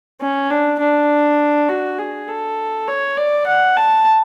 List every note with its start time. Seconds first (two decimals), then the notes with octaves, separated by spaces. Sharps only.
0.21 C#4
0.51 D4
0.80 D4
1.69 F#4
1.99 G#4
2.28 A4
2.88 C#5
3.17 D5
3.47 F#5
3.77 A5